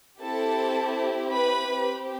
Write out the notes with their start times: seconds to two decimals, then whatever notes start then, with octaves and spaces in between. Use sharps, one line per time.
0.21 C4 E4 G4 A4 A5
1.33 B4 B5
1.70 C4 G4